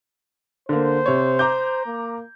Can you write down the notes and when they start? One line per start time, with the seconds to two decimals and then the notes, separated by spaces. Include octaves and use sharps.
0.69 D3 A#3 C5
1.06 C3 C#5
1.39 A#5 D6 G6
1.87 A#3